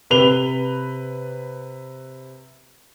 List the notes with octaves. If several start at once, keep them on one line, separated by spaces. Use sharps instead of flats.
C3 B4 F7 G7